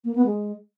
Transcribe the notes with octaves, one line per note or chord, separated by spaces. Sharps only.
A#3
B3
G#3